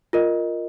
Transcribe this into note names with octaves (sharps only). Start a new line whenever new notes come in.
F4 A#4 D#5